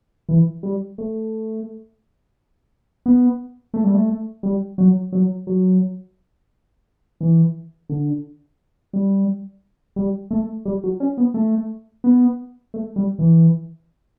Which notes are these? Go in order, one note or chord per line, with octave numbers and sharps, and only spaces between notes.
E3
G3
A3
B3
A3
G3
A3
G3
F#3
F#3
F#3
E3
D3
G3
G3
A3
G3
F#3
C#4
B3
A3
B3
A3
G3
E3